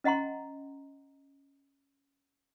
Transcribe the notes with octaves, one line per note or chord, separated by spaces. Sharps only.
C#4 D#5 F#5 A#5 C6